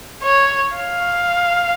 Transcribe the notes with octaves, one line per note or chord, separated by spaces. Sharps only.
C#5
F5